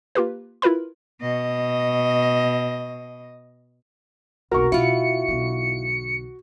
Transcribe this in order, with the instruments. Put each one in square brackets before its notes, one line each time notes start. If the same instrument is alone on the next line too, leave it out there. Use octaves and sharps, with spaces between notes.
[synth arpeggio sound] A#3 F4 G4 B4
E4 F4 A#4 B4 B5
[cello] B2 D#5
[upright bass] F1 B1 [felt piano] F#4 C#6 [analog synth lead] A#4
[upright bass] B2 [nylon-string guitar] E4 F4 [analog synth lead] C#7
[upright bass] B1 D3